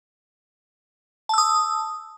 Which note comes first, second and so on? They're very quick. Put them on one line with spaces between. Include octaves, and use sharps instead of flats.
A5 E6 D#6